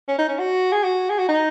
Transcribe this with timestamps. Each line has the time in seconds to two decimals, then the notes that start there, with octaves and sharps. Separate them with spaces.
0.08 C#4
0.18 D#4
0.28 C#4
0.39 F#4
0.72 G#4
0.84 F#4
1.10 G#4
1.18 F#4
1.29 D#4